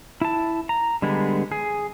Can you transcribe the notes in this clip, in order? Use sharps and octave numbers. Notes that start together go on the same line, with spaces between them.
E4 A5
A#5
D3 G3 G#3 B3
G#4